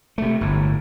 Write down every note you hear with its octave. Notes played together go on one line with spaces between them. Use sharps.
C3 A3
G1 A2